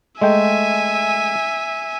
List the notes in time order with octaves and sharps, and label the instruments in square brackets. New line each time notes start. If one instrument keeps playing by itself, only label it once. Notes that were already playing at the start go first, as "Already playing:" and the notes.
[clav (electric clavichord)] G#3 A3 G5 [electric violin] E5 G#5